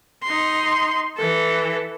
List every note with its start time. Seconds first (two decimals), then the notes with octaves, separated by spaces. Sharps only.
0.23 D#4 C6
1.17 E3 A4